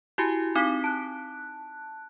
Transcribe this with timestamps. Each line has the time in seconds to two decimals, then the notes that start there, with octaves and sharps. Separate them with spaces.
0.18 E4 F#4 G4 G#5
0.55 C4 D#4 D6 B6
0.84 A5 F#6